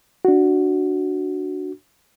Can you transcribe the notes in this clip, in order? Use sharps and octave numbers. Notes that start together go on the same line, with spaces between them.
D4 F#4